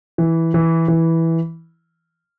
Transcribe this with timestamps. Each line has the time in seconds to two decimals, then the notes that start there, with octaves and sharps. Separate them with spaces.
0.18 E3
0.54 E3
0.88 E3